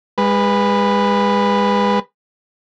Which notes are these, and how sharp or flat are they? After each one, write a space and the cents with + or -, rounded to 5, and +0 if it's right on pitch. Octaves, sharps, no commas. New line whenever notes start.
G#3 -30 B4 +0